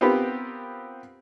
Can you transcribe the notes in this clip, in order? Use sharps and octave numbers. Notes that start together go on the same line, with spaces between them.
B3 C4 F4 G4 A#4 B4